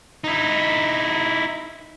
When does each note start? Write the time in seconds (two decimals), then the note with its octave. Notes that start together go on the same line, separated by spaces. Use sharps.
0.24 D#4 E4